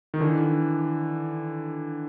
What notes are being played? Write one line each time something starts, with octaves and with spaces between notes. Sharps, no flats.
D#3
D3 E3